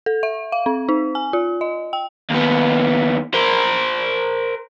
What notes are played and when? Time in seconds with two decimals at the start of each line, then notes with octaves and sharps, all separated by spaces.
0.06 A4
0.23 E5
0.52 F5
0.66 C4
0.89 D#4
1.15 G#5
1.33 F4
1.61 D#5
1.93 G5
2.30 D#2 B3
3.34 A#4 C5